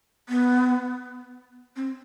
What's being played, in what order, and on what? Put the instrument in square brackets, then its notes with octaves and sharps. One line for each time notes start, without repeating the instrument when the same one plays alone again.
[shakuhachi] B3
C4